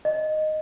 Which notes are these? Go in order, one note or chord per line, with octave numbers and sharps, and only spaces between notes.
D#5